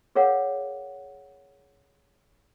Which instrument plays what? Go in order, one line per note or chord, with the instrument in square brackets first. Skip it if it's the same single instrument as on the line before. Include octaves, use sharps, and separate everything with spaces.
[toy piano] G#4 A#4 C#5 F5 F#5